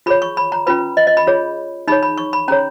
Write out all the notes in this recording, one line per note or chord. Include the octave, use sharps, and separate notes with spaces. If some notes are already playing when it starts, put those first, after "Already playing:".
F4 G#4 C#5 B5
C#6
B5
A#5
C#4 F4 B4 B5
D#5
D#5
B5
F4 G#4 C#5
D#4 G#4 C#5 B5
B5
C#6
B5
C#4 G#4 C#5 A#5